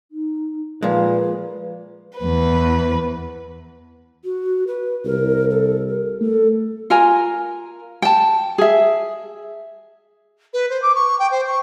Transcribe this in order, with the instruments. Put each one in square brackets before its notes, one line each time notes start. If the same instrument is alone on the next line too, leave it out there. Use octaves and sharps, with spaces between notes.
[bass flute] D#4
[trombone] A#2 [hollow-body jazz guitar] F3 G#3 [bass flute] B4
[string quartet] E2 B4
[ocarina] F#4
B4
[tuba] C2 [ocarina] A#4
[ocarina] A4
A#4
[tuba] A3 [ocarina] A4
[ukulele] F4 A#4 G#5 A#5
G5 A5
G#4 E5
[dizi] B4
C5
D6
C#6
G5
C5
C#6